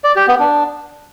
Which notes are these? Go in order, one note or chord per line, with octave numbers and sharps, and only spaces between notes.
D5
G4
B3
D4